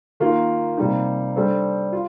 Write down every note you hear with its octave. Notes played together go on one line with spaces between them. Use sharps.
D#3 A#3 F4
C3 G3 A#3 D#4
G3 D4 A4 C5
F4